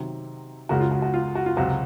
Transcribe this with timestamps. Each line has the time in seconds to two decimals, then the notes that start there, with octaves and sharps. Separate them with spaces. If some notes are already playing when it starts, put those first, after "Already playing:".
Already playing: C3 D#3 F#3
0.69 C#2 C#3 G#3 F#4 A#4
0.80 F4 G#4
0.91 F#4
1.02 F#4
1.14 F4
1.35 F#4
1.46 F4
1.56 C#2 C3 F#3 F#4